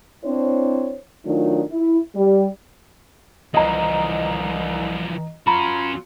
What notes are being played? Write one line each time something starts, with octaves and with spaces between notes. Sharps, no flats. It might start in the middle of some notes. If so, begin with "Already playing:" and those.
C4 D4 E4 C5 C#5
D#3 F#3 A3 D4 D#4 F4
E4
G3
C2 E3 F3 D#5 A#5
C#4 F4 F#4 A#5 B5